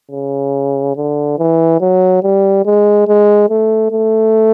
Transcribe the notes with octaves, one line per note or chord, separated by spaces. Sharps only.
C#3
D3
E3
F#3
G3
G#3
G#3
A3
A3